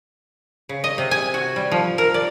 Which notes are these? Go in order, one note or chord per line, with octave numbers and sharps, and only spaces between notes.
C#3
D#5
C3
G#5
F#4
G3
F3
A#4
D5